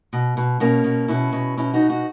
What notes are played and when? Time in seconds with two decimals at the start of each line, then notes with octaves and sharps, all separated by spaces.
0.13 B2
0.37 B2
0.60 B2 A#3 C#4
0.84 B2
1.08 B2 C#4 E4
1.32 B2
1.57 B2 C#4 E4
1.73 D#4 F#4
1.82 B2
1.90 D#4 F#4